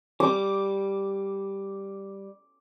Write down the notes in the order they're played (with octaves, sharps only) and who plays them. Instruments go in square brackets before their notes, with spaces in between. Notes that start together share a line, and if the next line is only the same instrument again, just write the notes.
[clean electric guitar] G3 [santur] D6